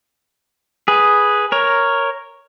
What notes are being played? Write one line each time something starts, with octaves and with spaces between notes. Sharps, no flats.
G#4 B4
A#4 C#5